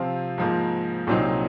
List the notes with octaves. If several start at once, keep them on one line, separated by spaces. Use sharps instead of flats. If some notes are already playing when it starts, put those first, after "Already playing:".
Already playing: C3 F3 C4 F4
G#2 F3 A#3
C2 A#2 F#3 C4 D#4